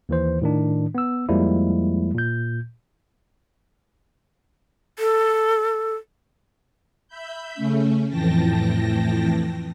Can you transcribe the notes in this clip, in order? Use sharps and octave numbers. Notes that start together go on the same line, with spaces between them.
D#2 E3 C5
A2 D#3 D4
B3 E6
F2 F3 G3 G#3 A#3 E4
A#2 G6
A4
E5 B5 G6
C#3 A3 C#4
F2 A2 E3 G5 A5 A#6